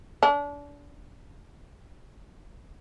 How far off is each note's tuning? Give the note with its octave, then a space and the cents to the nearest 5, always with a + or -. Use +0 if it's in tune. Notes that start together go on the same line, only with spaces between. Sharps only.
D4 -30